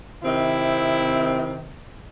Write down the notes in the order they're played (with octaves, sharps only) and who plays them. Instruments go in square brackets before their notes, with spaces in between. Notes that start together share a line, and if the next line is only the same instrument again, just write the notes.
[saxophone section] C3 D#3 C4 [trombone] E4